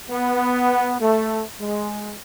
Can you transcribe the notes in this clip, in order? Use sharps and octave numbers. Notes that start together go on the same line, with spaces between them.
B3
A3
G#3